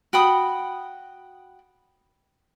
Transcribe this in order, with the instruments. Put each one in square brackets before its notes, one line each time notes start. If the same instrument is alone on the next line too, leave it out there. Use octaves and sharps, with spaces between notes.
[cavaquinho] F#4 G5 B5 D#6